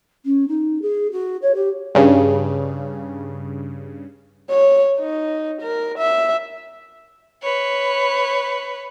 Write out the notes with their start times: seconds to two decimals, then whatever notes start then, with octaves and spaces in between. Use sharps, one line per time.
0.25 C#4
0.48 D#4
0.81 G#4
1.11 F#4
1.41 C#5
1.54 G4
1.95 G2 C#3
4.50 C#5
5.00 D#4
5.61 A#4
5.98 E5
7.42 B4 C#5